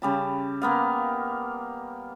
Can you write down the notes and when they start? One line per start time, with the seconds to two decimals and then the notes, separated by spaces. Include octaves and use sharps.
0.02 C#3 G3 A5
0.62 A#3 B3 F5